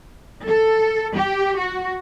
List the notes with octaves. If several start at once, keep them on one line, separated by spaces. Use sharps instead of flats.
A4
G4
F#4